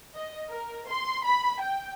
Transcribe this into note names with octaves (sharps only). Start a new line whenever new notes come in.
D#5
A#4
C6
B5
G5